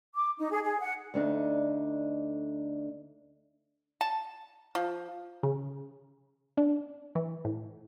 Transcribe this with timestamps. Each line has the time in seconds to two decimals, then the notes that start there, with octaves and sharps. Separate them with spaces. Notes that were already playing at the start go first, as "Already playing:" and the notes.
0.15 D6
0.38 D#4
0.51 G#4
0.63 G#4
0.81 F#5
1.14 D2 A3 D4 D#4
4.01 A5
4.75 F3
5.43 C#3
6.57 D4
7.15 E3
7.45 A2